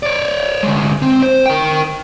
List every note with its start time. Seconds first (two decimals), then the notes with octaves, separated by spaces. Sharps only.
0.03 C#5 D5
0.63 D2 G#3
1.02 C4
1.23 C5
1.46 A#4 G5